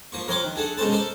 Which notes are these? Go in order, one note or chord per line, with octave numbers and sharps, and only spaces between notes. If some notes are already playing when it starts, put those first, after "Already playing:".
F3 A#3 C#6
F2 A#4 C#5 F#5 C6 D6
D#3
D4 G#4 A4 F#5
B2 G#3 C#4 A4 C5 A5
A4 A#4 C5 D5